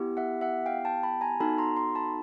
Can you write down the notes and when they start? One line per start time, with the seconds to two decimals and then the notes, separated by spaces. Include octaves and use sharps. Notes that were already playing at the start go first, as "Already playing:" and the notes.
Already playing: B3 E4 G4
0.17 E5 F#5
0.41 E5 F#5
0.66 F5 G5
0.85 G5 A5
1.03 A5 B5
1.21 G#5 A#5
1.40 B3 D#4 F#4 A4 A5 B5
1.58 A#5 C6
1.77 A#5 C6
1.95 A5 B5